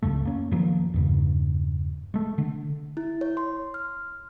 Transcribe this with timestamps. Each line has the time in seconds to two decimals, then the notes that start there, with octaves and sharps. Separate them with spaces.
0.03 C#2 F#2 C#3 A3
0.25 A#3 C#4
0.52 F#2 D#3 F3 A#3
0.94 E2 G2 C#3
2.14 G#3 A3
2.38 D3
2.97 E4
3.21 C#5
3.37 C6
3.74 F6